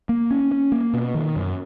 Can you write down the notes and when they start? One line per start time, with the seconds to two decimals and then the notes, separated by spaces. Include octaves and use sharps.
0.09 A#3
0.31 C#4
0.52 C#4
0.72 A#3
0.94 B2
1.15 D#3
1.36 F#2